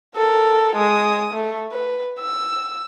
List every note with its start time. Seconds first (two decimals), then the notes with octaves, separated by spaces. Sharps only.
0.16 A4 A#4
0.76 G#3 D#6
1.34 A3
1.72 B4
2.21 E6